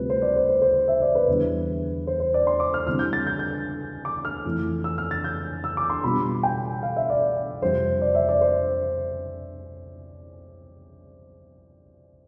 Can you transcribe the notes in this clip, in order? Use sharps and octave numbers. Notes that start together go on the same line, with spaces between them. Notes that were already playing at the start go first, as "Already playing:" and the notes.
Already playing: D2 C3 G3 C4 F4 B4
C5
D5
C5
C5
C5
E5
D5
B4
E2 D3 G3
C5
C5
D5
C6
D6
F6
D3 G3 C4 E4 F6
G6
A6
G6
G6
D6
F6
F2 E3 A3 E4
E6
F6
A6
G6
E6
D6
C6
B2 G3 B3 D4 F4 B5
G5
F5
E5
D5
F2 C3 G3 C5
D5
E5
D5
C5